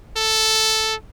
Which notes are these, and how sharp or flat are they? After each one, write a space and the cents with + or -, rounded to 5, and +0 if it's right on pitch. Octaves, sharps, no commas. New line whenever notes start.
A4 +0